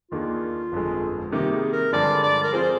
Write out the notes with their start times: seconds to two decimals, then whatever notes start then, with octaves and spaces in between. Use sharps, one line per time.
0.11 D#2 D#3 A#3 D4 F4 G#4
0.72 G1 F2 D3 G#3
1.32 C3 D#3 G3 A#3 D#4 G4
1.52 G#4
1.73 A#4
1.93 G2 D3 F3 G#3 D5
2.23 D5
2.44 A#4
2.53 F3 C4 F4 G#4 C5